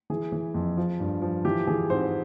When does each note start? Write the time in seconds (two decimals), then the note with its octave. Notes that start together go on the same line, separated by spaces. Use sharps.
0.10 E3 G#4
0.32 E3
0.54 F2
0.77 F3
1.00 G2
1.22 F3
1.45 E3 G4
1.67 E3 G#4
1.90 G#2 C4 C5